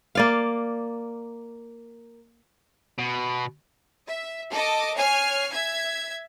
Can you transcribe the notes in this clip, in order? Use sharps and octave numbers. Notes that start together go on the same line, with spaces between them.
A#3 D5 F5
B2
E5
A4 D#5 D6
C#5 G#5 F6 C7
E5 G#6